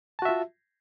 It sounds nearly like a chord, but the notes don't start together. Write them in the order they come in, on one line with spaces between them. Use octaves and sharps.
A5 F#4 E5 F4